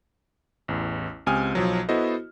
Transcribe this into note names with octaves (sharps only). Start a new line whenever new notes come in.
A1 E2
C#2 C4 G4 G#5 D#6 F6
B1 F3 F#3
B3 E4 F#4 A4 C5 D#5